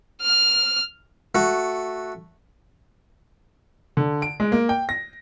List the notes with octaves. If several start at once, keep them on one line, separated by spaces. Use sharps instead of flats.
F6
A3 F#4
D3
D7
G#3
A#3
G5
A#6